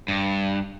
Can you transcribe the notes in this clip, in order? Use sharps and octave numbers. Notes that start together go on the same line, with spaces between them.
G2